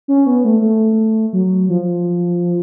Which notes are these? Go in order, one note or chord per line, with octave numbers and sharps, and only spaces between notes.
C#4
B3
A3
A3
F#3
F3